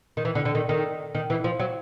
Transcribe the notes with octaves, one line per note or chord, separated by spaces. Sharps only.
D#3
E3
D3
D3
D#3
D#3
D#3
E3
F3
F#3